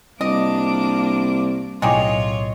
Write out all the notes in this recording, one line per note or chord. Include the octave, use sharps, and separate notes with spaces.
C2 A#3 D4 D#5 D6
B1 A2 D#4 F4 G4 G#4 C#5 D#5